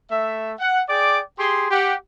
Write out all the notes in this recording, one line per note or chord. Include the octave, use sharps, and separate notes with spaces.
A3 E5
F#5
G#4 D5 G5 D6
G4 G#4 C6
G4 F#5